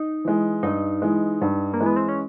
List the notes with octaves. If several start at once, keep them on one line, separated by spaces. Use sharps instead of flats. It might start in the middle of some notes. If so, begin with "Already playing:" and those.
Already playing: D#4
E3 G#3
G2 D#4
E3 G#3
G2
A#3
E3 G#3
B3
C4
C#4